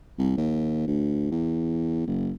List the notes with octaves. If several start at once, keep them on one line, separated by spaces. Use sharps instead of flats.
C2
D#2
D2
E2
F#1